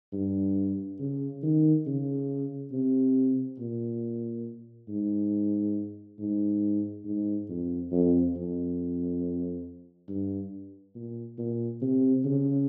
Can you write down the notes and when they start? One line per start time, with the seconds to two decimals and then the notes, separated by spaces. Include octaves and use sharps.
0.13 G2
1.00 C#3
1.43 D#3
1.86 C#3
2.72 C3
3.59 A#2
4.89 G#2
6.19 G#2
7.05 G#2
7.49 F2
7.92 F2
8.36 F2
10.09 G2
10.95 A#2
11.38 A#2
11.82 C3
12.25 C#3